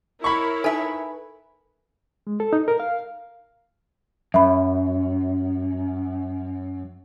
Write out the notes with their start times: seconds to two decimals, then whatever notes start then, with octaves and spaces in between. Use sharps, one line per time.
0.24 E4 A#4 C#5 B5 C#6
0.64 D#4 A4 B4 E5 G#5
2.27 G#3
2.40 A4
2.53 D#4
2.68 A#4
2.80 F5
4.34 F#2 E5 B5